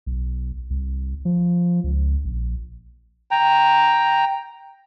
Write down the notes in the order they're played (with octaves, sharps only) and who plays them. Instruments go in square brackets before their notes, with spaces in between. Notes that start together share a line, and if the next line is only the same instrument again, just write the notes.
[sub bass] B1
C2
F3
C#2
A#1
[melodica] G5 A#5